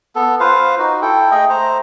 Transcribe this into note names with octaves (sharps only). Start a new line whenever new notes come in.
B3 A4
F4 B4 C5 F5
D#4 F#4
E4 A4 G5
A3 G#4 D#5 G5
A3 C5 A#5